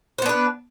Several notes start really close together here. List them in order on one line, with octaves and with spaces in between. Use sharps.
C5 B3 D4 B4